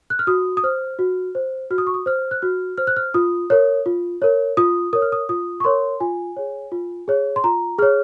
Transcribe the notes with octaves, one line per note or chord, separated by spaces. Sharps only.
F#6
F6
F#4 D#6
D#6
C5 F6
F#4
C5
F#4 F6
D#6
C#6
D#6
C5 F6
F#6
F#4 F6
C5 F6
F#6
F6
F4 D#6
A#4 C#5
F4
A#4 C#5
F4 D#6
A#4 C#5 D#6
F6
D#6
F4 D#6
C#6
A#4 C#5 C6
F4 G#5
G#4 C#5
F4
G#4 C#5
C6
F4 A#5
G#4 C#5 F6